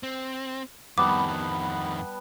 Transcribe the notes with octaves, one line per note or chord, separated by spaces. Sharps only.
C4
F2 D#3 G3 B3 A5 D6